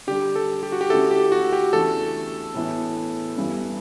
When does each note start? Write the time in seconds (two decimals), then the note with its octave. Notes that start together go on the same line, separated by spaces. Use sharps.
0.07 D3 G3 D4 G4
0.36 A4
0.63 G4
0.72 F#4
0.81 G4
0.90 D3 A3 C#4 E4 A4
1.11 G4
1.32 F#4
1.53 G4
1.73 E2 C#3 E3 A3 D4 A4
2.54 A2 E3 B3 E4
3.37 G2 E3 B3